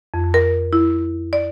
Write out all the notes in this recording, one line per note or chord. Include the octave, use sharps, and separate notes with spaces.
F2
A#4
E4
D5